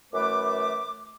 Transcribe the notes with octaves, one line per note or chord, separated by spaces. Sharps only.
F#2 E3 A3 B4 D6